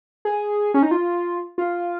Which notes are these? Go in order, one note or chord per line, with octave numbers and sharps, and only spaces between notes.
G#4
C#4
D#4
F4
F4